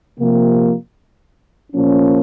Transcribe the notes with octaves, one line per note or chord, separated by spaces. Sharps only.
C3 F3 A#3
A#2 F3 A#3 C#4